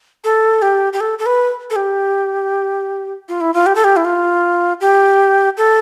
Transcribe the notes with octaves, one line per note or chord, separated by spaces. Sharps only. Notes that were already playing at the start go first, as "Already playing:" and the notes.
A4
G4
G4
A4
A4
B4
A4
G4
F4
E4
F4
G4
A4
G4
E4
F4
G4
A4